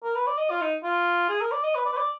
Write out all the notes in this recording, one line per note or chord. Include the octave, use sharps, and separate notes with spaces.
A#4
B4
D5
D#5
F4
D#4
F4
G#4
A#4
D5
D#5
B4
D5
B4
D5